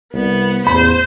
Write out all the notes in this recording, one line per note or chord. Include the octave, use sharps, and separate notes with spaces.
C2 B3
A1 E2 C5 B5